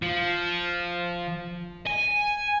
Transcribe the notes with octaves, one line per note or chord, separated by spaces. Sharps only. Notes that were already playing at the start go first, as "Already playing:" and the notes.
F3
G#5